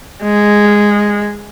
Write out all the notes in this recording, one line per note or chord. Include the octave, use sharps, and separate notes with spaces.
G#3